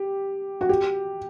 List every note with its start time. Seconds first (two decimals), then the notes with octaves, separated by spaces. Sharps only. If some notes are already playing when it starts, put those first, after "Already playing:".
Already playing: G4
0.61 F#4
0.69 G4